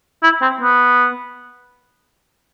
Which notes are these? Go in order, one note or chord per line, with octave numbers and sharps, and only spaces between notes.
E4
C4
B3